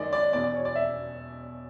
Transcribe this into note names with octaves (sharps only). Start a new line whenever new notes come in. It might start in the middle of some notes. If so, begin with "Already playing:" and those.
Already playing: F#2 D#3 G#3 D5 D#5
D5
E1 E2 B2 D5
D5
C#5
D5
E5